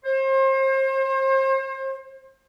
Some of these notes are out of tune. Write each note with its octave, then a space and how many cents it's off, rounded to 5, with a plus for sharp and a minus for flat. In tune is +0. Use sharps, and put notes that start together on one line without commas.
C5 +35